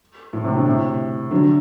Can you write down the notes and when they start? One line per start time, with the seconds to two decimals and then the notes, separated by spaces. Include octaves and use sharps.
0.33 A2
0.44 A2 C3
0.55 B2 D3
0.66 A2 C3
1.31 D3 F#3